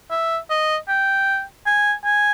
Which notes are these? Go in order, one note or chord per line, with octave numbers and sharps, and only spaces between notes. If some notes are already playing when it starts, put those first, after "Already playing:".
E5
D#5
G5
G#5
G#5